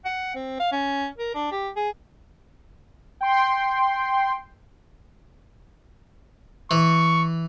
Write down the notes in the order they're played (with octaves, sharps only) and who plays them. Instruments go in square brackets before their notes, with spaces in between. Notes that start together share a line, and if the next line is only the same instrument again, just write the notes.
[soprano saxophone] F#5
C4
F5
C#4
A#4
D4
G4
G#4
[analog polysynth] G5 C6
[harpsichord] E3 [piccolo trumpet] C#6